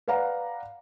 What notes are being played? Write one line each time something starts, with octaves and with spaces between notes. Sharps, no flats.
B4 D5 F5 F#5 A#5